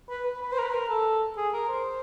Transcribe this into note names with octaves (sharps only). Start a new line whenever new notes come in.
B4
B4
B4
C5
A#4
B4
A#4
A4
G#4
A#4
C5